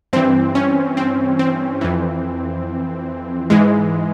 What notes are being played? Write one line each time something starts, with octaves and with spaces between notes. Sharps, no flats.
G2 E3 C4
C#4
C4
C4
F2 E3
G#2 E3 G#3